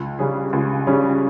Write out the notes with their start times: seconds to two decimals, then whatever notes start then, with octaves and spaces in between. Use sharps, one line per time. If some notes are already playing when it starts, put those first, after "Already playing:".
Already playing: C#2
0.19 C#3 G3 C#4 G#4
0.53 C#2
0.87 C#3 G3 C#4 G#4